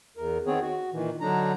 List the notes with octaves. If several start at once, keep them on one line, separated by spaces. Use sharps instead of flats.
E2 A#4
D#3 B3 C4 G#4 C#5
F#4
A#2 D#3 E3
D3 F#3 D4 D#4 A#5